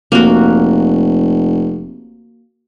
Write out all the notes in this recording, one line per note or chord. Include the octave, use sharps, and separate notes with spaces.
F1 A#3 F#4